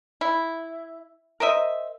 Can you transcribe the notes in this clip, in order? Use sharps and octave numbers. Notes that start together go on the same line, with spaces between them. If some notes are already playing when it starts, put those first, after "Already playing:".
E4
A#4 C5 D#5 E5